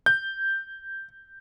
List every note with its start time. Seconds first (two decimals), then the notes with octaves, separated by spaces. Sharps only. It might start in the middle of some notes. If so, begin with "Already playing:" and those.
0.06 G6